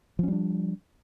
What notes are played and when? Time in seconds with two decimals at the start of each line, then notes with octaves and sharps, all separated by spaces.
0.19 F3
0.23 C#4
0.28 G3
0.32 D4